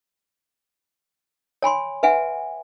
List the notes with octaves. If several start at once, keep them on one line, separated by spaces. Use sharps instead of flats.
C#5 G#5 B5 C6
B4 E5 F#5 G#5